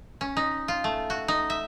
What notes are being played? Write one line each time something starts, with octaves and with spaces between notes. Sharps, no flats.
C#4
D#4
F4
A3
F#4
D#4
E5